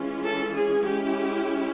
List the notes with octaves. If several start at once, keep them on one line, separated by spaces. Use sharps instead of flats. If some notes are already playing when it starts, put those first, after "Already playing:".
Already playing: E3 G#3 C#4 F4
A4
G#4
G#3 C#4 E4 G4